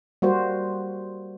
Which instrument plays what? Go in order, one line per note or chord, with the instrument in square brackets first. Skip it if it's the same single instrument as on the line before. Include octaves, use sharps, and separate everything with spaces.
[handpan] G3 A#3 F#4 C5